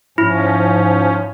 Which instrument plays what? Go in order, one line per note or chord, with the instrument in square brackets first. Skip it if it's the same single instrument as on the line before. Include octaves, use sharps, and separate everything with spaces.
[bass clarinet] G#2 [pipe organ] F3 C#4 [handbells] E4